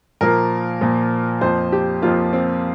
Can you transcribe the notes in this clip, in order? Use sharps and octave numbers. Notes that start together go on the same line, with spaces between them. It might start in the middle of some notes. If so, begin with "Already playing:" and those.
A#2 F3 A#3 A#4
A#2 F3 A#3
F2 F3 A#3 C5
G4
F2 F3 A#3 F4
C4